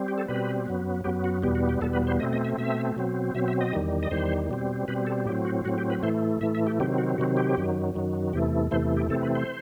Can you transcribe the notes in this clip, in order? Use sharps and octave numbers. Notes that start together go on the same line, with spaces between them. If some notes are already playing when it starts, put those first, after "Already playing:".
Already playing: G3 C4
G4
A4
B2 G3 C4 B4
F#2 F#3 B3
F#2 F#3 B3 G4
F#4
E2 B2 G3 B3 G4
F#4
G4
E2 B2 G3 B3 A4
B4
C5
B2 A3 C4 D#5
D#5
E5
B2 A3 C4 E5
B2 F#3 C4
B2 F#3 C4 E5
E5
D#5
E2 D#3 G3
D#5
E2 D#3 G3 C5
B2 G3 C4
B2 G3 C4 B4
A4
A2 F#3 C4 G4
F#4
A2 F#3 C4 F#4
G4
B4
A2 E3 A3 C5
A2 E3 A3 E5
E5
G4
C3 D#3 F#3 C4 G4
F#4
C3 D#3 F#3 C4 F#4
G4
F#2 D#3 F#3
F#2 D#3 F#3
E2 C3 E3 A3 G4
E2 C3 E3 A3 C5
G4
C3 E3 A3 C4 A4
B4
C5